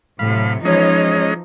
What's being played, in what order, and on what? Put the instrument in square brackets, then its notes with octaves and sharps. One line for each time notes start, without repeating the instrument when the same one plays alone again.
[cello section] A2 C3 F#3 [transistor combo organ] F5 B5
[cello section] E3 F3 D#4 [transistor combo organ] G#3 C#4 D#5 [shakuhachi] C#5